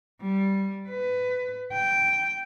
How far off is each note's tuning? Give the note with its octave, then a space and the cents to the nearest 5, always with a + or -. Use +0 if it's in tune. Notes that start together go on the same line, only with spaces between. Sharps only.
G3 -10
B4 +20
G5 -5